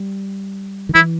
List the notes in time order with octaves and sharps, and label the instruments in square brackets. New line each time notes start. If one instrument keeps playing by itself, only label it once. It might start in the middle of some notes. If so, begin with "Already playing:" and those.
Already playing: [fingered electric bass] G3
D#3
[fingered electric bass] E3 [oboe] E4